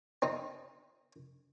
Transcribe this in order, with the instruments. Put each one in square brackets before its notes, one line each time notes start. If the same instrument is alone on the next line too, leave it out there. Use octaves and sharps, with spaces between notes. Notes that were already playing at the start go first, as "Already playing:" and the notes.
[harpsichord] C4 D#4